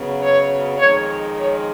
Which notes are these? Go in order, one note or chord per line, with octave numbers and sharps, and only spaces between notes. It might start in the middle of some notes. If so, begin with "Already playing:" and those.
Already playing: F#2 C#3 F#3 B3
C#5
F2 D#3 G#3 C#5
C#5